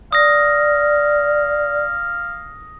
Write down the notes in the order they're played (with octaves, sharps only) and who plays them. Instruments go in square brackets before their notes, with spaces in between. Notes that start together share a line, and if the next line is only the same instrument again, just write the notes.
[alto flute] D5 [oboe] F5 [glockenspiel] D#6 A#6